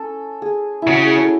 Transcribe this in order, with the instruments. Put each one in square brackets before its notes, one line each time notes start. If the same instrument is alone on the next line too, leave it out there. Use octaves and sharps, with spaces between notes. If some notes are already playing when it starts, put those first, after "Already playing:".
Already playing: [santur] C#4 A4
G#4
E4
[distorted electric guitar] C#3 [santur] F#4
[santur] G#4
A4